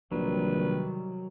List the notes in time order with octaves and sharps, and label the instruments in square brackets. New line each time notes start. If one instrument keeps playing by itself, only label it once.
[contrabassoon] A#1 [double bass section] C3 D#3 G3 [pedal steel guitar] F#3 [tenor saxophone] B4